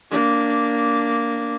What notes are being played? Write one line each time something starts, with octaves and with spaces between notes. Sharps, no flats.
A#3 D4